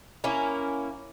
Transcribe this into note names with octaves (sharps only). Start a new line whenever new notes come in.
A#3 C#4 E4